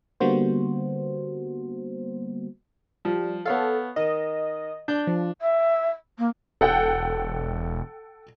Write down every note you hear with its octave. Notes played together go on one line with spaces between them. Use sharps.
D3 G3 A#3 B3 F#4 C5
F3 G3
B3 A4 C#5 F5
D#3 D#5
D4 G6
F3
E5
A#3
E1 A4 F#5 G5